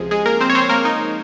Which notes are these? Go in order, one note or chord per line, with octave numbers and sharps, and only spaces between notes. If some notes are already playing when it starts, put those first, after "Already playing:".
Already playing: C#2 C3 F3 G#3 G#4
G#3 G#4
A#3 A#4
C4 C5
C#5
C4 C5
A#3 A#4
D#4